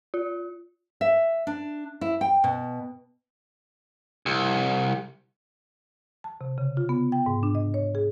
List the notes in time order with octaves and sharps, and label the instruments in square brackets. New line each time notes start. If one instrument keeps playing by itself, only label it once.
[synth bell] F4
[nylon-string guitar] E5
D4
E4
G5
B2
[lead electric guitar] C2
[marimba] A5
C3
C#3
F4
B3
G5
G#2
D4
D#5
C#5
G#4